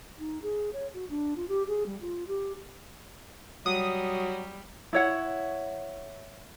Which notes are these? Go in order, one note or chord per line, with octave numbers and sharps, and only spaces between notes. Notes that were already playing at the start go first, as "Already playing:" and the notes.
D#4
G#4
C#5
F#4
D4
F4
G4
G#4
G3
F4
G4
F#3 G3 D#6
E4 C#5 F#5